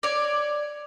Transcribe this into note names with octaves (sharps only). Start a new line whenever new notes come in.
C#5 D5